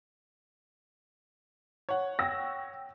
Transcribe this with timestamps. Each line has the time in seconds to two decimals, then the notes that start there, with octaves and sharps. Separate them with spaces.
1.89 C#5 F#5
2.19 G5 E6 A#6